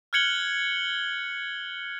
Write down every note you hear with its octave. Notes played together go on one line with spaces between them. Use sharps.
F6 F#6 G#6 C#7 F#7 G7